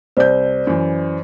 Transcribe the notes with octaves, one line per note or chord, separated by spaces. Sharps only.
C2 C5 D5 G6
F#2 E3